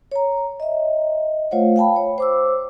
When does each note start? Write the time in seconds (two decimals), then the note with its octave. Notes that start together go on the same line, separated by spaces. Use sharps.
0.12 C#5 A#5
0.60 D#5 E5
1.51 A3 F4 C5 C#5 F5 F#5
1.76 F5 G5 A5 B5
1.96 C#5
2.18 C5 D6 E6